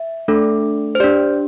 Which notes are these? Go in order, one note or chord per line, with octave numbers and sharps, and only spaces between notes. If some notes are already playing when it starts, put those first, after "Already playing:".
Already playing: E5
A3 D4 A4
C5
D4 G4 D5